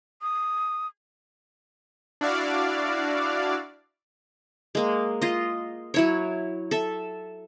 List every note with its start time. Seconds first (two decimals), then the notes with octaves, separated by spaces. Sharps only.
0.22 D#6
2.21 D4 E4 F#4 D5 F5
4.75 G#3 A#3
5.22 F4 D#5
5.94 F#3 E4 C#5
6.71 A4 E5